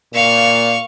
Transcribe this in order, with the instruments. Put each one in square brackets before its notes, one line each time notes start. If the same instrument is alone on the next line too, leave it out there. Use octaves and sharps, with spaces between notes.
[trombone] A#2 [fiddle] F5 C#6